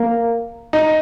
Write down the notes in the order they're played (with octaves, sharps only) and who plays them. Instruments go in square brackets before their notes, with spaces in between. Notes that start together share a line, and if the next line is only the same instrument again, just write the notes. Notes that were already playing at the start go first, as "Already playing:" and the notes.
Already playing: [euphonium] A#3
[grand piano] D#4